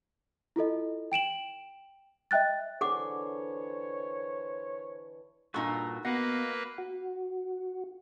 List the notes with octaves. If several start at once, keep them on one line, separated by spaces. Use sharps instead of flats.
E4 F4 A4 D#5
G5 D7 E7 F#7
D#5 E5 G5 F#6 A6
D3 E3 G#4 C5 C#5 F#5 D6
G2 A#2 D#4 F#4 A4 C#6
A#3 B3 F#4 B4 D#5 F5 F#5
F#4